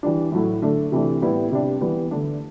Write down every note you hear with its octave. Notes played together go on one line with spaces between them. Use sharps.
E3 G3 D4
A2 F#3 A3 E4
D3 A3 D4
C3 E3 A3 D4
A2 G3 B3 E4
C3 G3 D4
E3 G3 B3
D3 A3 D4